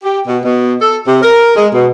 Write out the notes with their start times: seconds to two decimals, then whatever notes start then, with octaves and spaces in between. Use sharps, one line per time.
0.03 G4
0.27 B2
0.45 B2
0.81 A4
1.06 C3
1.22 A#4
1.56 G#3
1.74 B2